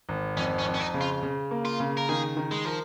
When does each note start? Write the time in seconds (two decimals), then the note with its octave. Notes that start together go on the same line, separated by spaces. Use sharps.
0.09 G#1
0.37 F2 C#4
0.59 C#4
0.65 F2
0.74 C#4
0.80 D#4
0.94 C#3
1.01 F4
1.23 C#3
1.51 A#3
1.65 F4
1.80 C#3
1.97 A#4
2.09 D#3 G#4
2.37 D#3
2.51 G#3
2.65 F3 A#4